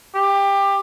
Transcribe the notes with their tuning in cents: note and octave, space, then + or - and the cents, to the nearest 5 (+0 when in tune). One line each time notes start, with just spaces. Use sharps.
G4 +20